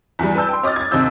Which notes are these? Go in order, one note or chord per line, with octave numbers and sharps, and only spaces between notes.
E2 E3 G3
B4 D5 A5 E6 G6
G5 C6
C#5 D#5 D6 D#6 F6 A6
G#6 A6
D#2 C3 C4 D#5 E6 G6